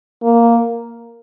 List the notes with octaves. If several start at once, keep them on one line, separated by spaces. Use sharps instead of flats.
A#3